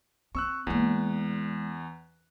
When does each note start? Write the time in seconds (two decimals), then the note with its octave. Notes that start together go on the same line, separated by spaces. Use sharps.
0.35 C4 C#6 E6 F#6
0.67 E2 G#3 A#3